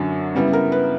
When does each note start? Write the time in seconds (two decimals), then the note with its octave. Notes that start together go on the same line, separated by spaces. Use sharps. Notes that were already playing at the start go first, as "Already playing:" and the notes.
Already playing: F#2 D3 F#3
0.35 C#3 G3 B3 E4
0.53 A#4
0.72 B4